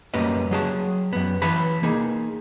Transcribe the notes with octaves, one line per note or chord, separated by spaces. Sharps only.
F#2 G3 A#3 C#4 B4 D#5
F#3 G#4 A5
F#2 B3
E3 B4 C#5 A5 B5
A#3 D#4 G#4